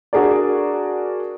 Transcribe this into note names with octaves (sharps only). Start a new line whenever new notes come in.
D4 F#4 G#4 A#4 D5